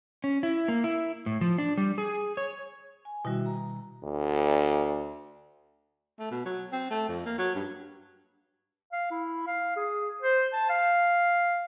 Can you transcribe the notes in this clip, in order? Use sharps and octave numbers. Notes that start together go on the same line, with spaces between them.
C#4
E4
A#3
E4
A2
F3
D4
G3
G#4
C#5
G#5
B2 D#3 G3 E4 F#4 E5
A#5
D2
A3
B2
F#3
C4
A3
F2
A#3
F#3
G2
F5
E4
F5
G#4
C5
A5
F5